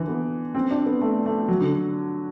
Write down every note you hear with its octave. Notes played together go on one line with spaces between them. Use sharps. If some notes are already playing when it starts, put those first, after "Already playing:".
Already playing: D3 E3
B3
C4
D4
B3
A3
A3
F#3
D3